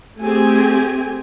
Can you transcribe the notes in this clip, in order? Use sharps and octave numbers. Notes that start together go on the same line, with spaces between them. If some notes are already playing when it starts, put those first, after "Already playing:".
A3 C4 G4 G#4 G#5